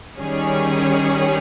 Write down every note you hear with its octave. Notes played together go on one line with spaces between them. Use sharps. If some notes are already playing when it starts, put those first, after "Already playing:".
D#3 G3 C#4 G#4 C#5